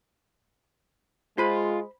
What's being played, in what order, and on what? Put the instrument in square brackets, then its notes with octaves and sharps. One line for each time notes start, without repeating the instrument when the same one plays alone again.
[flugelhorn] G#3 [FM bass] F4 [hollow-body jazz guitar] C5 B5